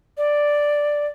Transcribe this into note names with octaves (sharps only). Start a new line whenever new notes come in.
D5